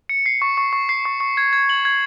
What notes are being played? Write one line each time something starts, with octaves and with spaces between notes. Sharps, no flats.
C#7
C7
C#6
C#6
C#6
C7
C#6
C#6
G#6
G#6
F#7
G#6